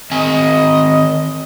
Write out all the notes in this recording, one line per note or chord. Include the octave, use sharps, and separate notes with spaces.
D#3 C4 D#5 G#5